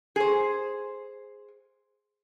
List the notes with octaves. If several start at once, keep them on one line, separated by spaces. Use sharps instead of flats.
G#4 C5